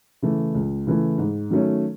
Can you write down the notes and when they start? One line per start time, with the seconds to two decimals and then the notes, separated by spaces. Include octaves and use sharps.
0.22 C#3 E3 A3
0.55 C#2
0.87 C#3 E3 A3
1.18 G#2
1.51 D#3 F#3 A3 C#4